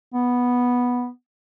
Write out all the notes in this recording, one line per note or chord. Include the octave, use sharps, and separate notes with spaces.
B3